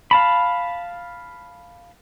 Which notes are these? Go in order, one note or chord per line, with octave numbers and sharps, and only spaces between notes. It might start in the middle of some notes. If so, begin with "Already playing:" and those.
F5 A5 B5